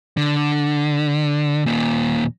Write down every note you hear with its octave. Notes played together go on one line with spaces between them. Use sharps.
D3
D#2 A#2